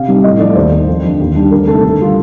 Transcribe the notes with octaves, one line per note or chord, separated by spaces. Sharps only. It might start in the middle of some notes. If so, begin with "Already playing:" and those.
Already playing: C3 F5
G3 C4 D#4
A2 D#5
F3 A3 D5
D#2 C5
D#3 A#3
F2
D3 F3
D#2
D#3 G3 D4
D2 A#4
C3 D#3 A3 A4
D3
G3 D4 F4